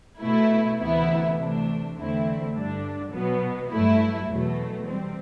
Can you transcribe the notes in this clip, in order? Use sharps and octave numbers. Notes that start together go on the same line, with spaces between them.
B2 A3 E4
D2 C3 E3 B3 E4
C3 E3 A3 D4
E2 D3 A3 C4 E4
G2 D3 G3 D4
B2 F#3 B3
G2 F#3 A3 E4
E2 B2 F#3 A3
C3 G3 C4